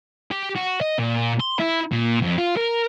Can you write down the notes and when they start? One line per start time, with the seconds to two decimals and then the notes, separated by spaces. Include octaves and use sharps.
0.31 G4
0.56 F#4
0.81 D#5
0.99 A#2
1.40 C6
1.59 E4
1.92 A#2
2.22 F2
2.38 F4
2.56 A#4